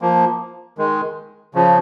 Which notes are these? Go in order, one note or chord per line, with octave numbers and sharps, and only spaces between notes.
F3 A#3
D#3 G#3
C#3 F3